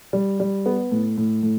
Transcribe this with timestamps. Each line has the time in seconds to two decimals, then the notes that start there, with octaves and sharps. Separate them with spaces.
0.13 G3
0.40 G3
0.66 B3
0.92 A2
1.18 A2
1.43 A2